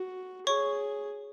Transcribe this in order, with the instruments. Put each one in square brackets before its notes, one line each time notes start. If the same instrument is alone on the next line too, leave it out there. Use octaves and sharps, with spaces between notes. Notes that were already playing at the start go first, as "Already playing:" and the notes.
Already playing: [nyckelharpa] F#4
[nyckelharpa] G#4 [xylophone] C#5 C#6